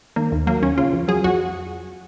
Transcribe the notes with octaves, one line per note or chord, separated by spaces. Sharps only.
D#3 A#3
D#2
F#3 A#3
D#2 C#4
C#3 F4
F2
F#3 G#4
F2 F#4